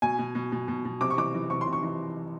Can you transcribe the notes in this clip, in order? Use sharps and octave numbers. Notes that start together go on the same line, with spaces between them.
B2 G#5
B2
B2
B2
B2
B2
C3 D6
C#6
E3 D6
E3
C3 C#6
C6
C3
C#6
E3